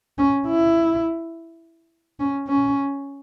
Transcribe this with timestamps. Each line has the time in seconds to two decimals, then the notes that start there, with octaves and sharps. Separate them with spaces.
0.18 C#4
0.47 E4
2.20 C#4
2.48 C#4